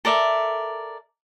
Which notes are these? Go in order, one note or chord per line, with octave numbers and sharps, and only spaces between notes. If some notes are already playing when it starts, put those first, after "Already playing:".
A4 A#4 D5 E5